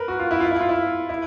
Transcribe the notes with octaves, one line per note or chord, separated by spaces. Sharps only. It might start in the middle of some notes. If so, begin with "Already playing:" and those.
Already playing: A#4 B4
F#4
F4
E4
F4
E4
F4
E4
E4